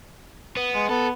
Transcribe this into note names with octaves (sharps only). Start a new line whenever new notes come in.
B3
G#3
B3 A4